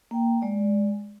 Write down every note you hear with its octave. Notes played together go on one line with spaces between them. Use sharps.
A#3 G5
G#3 D5